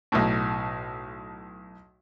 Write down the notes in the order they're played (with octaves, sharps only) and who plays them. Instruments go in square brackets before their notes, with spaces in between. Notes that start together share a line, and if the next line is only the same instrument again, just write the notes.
[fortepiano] B1 A2